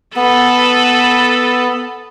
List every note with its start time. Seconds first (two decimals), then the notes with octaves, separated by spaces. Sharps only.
0.16 B3 A4 B4